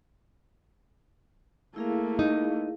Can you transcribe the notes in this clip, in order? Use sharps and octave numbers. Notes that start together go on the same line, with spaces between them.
A3 A#3 E4 G#4 F5
D#4